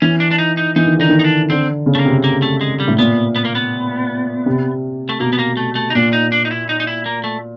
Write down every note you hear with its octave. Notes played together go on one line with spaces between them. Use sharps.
E3 C#4
D4
D4
D#4
D#4
E3 D#4
D#3
D3 D#4
D#3
D#4
D4
D3 C4
C#3
A3
A#3
C3
A#3
A3
G#3
G3
A2
A#2 B3
B3
A#3
B3
C3
A3
B2 A#3
B3
A#3
A3
A3
D#4
A#2 D4
D#4
D4
D#4
E4
D#4
D#4
E4
A#3
A3